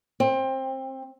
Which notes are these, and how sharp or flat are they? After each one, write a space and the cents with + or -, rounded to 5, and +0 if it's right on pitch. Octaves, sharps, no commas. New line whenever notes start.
C4 +20